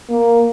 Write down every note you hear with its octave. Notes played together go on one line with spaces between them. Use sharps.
A#3